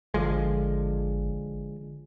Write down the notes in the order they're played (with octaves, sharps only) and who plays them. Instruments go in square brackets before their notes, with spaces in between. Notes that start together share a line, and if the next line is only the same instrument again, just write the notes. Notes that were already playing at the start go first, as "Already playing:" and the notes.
[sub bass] G#1 [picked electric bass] D3 F3 G#3